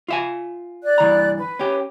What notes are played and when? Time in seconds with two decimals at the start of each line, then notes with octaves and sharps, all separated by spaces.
0.08 F4 E5 G#5
0.83 D5 F#6
0.98 G2 E3 A#5
1.39 B4
1.59 C#4 G4